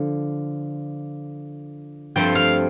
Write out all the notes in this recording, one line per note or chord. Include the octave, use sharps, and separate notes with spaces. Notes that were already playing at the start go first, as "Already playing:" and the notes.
Already playing: D3 F3
G2 F3 A3 C4 G5
F5